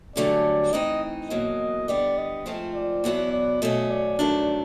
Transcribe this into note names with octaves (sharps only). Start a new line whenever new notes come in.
G2 D3 F#3 A3 C#4 D5
E3 A3 C4 D#4 D#5
E2 B2 F#3 A#3 D#5
D3 G3 B3 D5
D#5
G#2 F3 A3 C4 F4
D5
E2 B2 F#3 B3 E4
D5
B2 F#3 A3 C#4 D#5
D5
G2 D#3 F#3 A3 D4